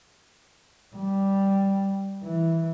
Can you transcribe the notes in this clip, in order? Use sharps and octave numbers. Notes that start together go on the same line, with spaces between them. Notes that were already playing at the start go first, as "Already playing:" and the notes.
G3
E3